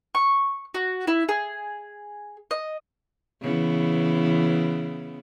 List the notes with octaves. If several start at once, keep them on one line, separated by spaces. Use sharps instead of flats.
C#6
F#4
E4
G#4
D#5
C#3 E3 B3